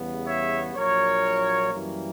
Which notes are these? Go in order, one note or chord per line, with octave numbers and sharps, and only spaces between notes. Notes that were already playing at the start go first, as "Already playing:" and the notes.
Already playing: E2 C#3 G3 B3
C#5 E5
A#1 A#2 F#3 A#4 C#5
F#2 E3 G3 A#3